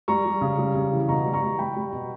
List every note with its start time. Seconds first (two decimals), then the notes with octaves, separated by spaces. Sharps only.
0.08 G3 A#5 C#6
0.25 G3
0.41 C#3
0.58 G3
0.75 C#3
0.92 E3
1.08 B2 A#5 C#6
1.26 G3
1.33 A#5 C#6
1.42 G3
1.59 G3 G5 B5
1.76 G3
1.93 B2